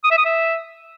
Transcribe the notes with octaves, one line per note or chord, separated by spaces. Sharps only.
D#6
E5
D#6
E5